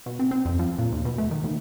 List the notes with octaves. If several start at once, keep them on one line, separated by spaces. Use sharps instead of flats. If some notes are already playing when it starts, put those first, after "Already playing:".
B2
C4
C4
F2
F3
A#2
D#2
B2
A3
D#3
D#2